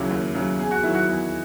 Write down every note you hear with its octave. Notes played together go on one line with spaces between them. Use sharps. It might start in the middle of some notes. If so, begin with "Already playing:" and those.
Already playing: D#2 C#3 F#3 E4
D#2
C#3 F#3
E2 G#4
F#4
D#3 F#3 E4
F#4
E2 E4